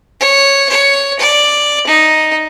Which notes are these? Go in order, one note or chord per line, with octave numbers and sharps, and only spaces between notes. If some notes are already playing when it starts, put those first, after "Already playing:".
C#5
C#5
D5
D#4